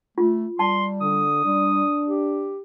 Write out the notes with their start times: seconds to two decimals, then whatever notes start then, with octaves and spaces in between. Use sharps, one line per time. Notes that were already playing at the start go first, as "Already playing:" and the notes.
0.18 A3 F4
0.59 G3 A5 C6
1.01 D3 D#6
1.44 G3 D4
2.07 G4